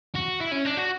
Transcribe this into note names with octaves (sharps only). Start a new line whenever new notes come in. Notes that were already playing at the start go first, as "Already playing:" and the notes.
F#4
E4
C#4
D4
F#4